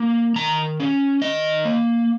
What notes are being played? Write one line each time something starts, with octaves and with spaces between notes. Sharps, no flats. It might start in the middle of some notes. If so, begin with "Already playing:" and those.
Already playing: A#3
D#3 A#5
C#4
D#3 D#5
A#3